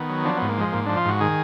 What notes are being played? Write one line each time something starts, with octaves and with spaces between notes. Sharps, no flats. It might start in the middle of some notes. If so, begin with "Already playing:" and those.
Already playing: D#3 B3
F#3
F3 D4
G#2 B3
A#3
F3 G#3
G#2 A#3
F3 D4
F4
G#2 F#4
D#3 G#4